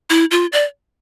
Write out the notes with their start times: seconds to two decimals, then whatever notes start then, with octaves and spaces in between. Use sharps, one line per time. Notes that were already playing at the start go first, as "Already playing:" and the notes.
0.10 E4
0.31 F4
0.53 D5